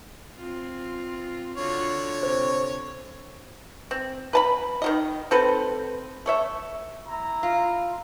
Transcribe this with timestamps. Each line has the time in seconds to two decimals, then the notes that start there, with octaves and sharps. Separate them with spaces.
0.36 C4 F4
1.57 D3 F4 F#4 C#5
2.23 C3 C5
3.91 C4
4.33 B4 A5 B5
4.82 D#3 F#3 D#5
5.31 C4 A4 B4 C5
6.26 A3 C#5 E5
7.07 E4 A#5
7.43 F4